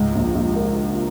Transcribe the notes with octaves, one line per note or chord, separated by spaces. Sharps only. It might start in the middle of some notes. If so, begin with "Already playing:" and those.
Already playing: C#2 G#2
A#1
A#1
A#4